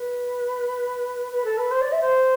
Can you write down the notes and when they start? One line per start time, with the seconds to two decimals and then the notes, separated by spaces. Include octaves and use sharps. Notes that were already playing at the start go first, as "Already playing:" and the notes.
Already playing: B4
1.31 B4
1.44 A4
1.57 B4
1.70 C5
1.81 D5
1.92 E5
2.01 C5